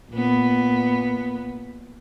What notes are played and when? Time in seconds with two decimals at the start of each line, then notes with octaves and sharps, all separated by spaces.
0.11 A#2 B3